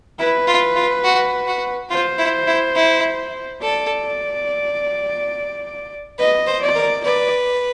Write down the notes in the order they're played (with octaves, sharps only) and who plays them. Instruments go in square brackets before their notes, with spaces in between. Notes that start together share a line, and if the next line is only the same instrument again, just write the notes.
[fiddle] E4 [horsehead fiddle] B4
[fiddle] F4
F4
F#4
F#4
[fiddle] F4 [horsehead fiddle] C5
[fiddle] E4
E4
E4
[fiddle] A4 [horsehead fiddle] D5
[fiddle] B4 [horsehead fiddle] D#5
[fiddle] C5
[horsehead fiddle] D5
[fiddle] A#4
[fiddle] B4 [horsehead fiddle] D5